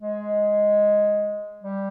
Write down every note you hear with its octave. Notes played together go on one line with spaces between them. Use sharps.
G#3
G3